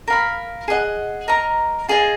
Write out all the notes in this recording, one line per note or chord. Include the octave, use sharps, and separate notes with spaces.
A#4 F5 B5
G#4 D#5 F#5
A#4 D#5 A#5
F4 G#4 D#5 G#5